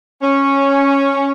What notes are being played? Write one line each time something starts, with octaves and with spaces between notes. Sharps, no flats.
C#4